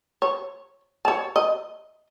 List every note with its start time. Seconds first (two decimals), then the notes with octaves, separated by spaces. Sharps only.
0.22 C#5
1.05 C#5 A5
1.36 D#5